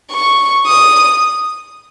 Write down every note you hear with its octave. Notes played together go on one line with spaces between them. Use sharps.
C#6
D#6